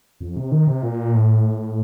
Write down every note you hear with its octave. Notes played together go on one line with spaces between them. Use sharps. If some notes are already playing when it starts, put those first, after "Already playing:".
F2
C3
D#3
C3
A#2
A2